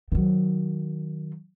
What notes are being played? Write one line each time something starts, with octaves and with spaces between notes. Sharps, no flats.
D#3 F#3